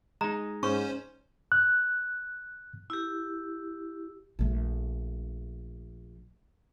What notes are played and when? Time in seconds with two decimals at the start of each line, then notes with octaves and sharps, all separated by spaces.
0.21 G#3 D#4 A#5
0.63 G#2 C#4 C5 C#6
1.52 F#6
2.90 E4 G4
4.39 A#1 A3